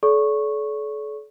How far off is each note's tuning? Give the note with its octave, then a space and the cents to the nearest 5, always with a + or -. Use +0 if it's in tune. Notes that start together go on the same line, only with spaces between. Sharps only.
A4 -40 D5 -40 C#6 -10